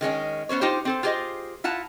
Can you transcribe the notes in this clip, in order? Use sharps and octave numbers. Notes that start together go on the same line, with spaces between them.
D#3 G#3 C#4 D#5
B3 C#4 C5 C#5
D#4 F4 G4 C5
C4 A4 C5
F4 G4 G#4 C5 D#5
E4 F4 F#5 A5 A#5